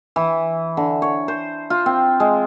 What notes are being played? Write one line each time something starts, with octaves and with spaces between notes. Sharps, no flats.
E3
D3
C#5
C5
F4
C4
G#3